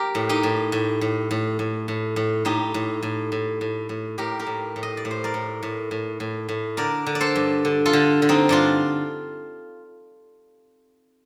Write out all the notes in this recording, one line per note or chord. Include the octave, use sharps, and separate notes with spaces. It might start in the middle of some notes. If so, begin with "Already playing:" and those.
Already playing: G4 A#4
A2
D#4 G4
A2
A2
A2
A2
A2
A2
A2
A2 D#4 G4
A2
A2
A2
A2
A2
A2 G4 A#4
G4 A#4
A2
A2
D#5
D5
A2
C5
A#4 D5
A2
A2
A2
A2
A2
D3 A#4 D5
D3
D5
A4 C5
G2
D3
F4 A4
D3
D3
C4 D#4
G2 D4 F4